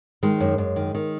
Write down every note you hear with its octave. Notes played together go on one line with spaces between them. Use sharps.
D#3 G#3
F#2
F#2
D#3
D#3